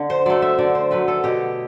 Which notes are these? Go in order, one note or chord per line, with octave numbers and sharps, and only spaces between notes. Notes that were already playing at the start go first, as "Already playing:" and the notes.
Already playing: D3
C5
F#3 A3 D5
E5
D3 D5
C5
F#3 A3 B4
A4
B2 G4